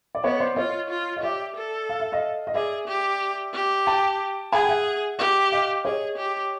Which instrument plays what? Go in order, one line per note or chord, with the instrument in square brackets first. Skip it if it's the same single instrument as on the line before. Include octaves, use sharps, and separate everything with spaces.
[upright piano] D5
[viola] B3 [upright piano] C#5 D#5
[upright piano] C5 D5
[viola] F4 [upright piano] C#5 D#5
[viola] F4
[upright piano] D#5
[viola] G4 [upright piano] D5 E5
[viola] A4
[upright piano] F5
E5
D#5 F5
D#5
[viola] G#4 [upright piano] D5 E5
[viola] G4
G4
[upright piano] G5 A5
[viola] G#4 [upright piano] F#5 G#5
[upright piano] G5
E5 F#5
[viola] G4 [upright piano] D5 E5
[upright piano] D#5 F5
[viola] G#4 [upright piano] C#5 D#5
[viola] G4